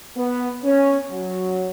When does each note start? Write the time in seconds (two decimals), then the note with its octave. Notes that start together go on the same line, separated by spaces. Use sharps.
0.17 B3
0.64 C#4
1.11 F#3